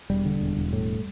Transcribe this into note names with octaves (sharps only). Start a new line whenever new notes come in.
E1 G3
D3
E1
E1
A2